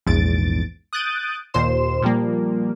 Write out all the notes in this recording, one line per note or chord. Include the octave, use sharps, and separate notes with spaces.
A#1 E2 G#2 A6 D7
D#6 F#6 G6 A6 D7 D#7
D#2 A#2 C5 C6 E7
A#2 F3 G3 A#3